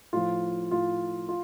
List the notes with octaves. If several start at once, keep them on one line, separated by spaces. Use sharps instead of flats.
A2 F3 F4
A2 F3 F4
F4